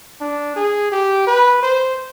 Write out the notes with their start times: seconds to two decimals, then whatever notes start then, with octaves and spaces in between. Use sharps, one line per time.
0.21 D4
0.56 G#4
0.92 G4
1.27 B4
1.63 C5